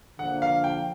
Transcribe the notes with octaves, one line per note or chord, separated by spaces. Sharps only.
D3 F3 A#3 F#5
F5
G5